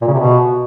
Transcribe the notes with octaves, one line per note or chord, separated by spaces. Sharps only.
A#2
C#3
C3
B2